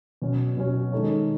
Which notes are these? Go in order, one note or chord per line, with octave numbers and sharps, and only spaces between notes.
B2 F#3 C#4
B2 F#3 C#4
D#3 G#3 D#4 A4 C#5